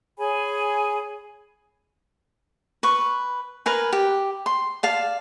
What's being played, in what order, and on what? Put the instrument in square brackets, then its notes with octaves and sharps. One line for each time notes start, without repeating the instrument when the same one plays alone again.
[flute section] G#4 C#5 G#5 B5
[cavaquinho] B4 C#6
A#4 B4 G#5
G4
C6
D5 F5 A5